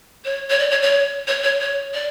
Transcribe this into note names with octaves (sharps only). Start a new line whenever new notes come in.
C#5
C#5
D5
C#5
C#5
C#5
C#5
C#5
D5